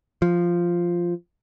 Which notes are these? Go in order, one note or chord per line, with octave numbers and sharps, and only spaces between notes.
F3